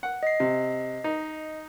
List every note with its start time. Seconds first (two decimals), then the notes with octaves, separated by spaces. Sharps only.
0.03 F#5
0.23 D#5 C7
0.40 C3
1.04 D#4